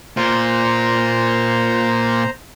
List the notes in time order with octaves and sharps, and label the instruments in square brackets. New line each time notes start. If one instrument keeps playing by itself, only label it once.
[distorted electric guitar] A#2 F4 [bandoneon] C5 A#5